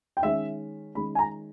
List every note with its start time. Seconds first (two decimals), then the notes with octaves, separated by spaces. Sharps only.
0.17 G5
0.22 D#3 G#3 C#4 E5
0.95 D#3 G#3 C#4 B5
1.15 G#5
1.19 A#5